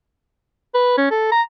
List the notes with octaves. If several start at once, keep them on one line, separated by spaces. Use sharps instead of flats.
B4
C#4
A4
A#5